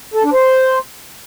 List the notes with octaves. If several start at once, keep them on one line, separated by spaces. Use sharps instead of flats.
A4
D4
C5